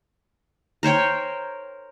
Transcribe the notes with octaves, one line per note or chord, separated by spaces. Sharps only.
A#4 C5 C#5 G5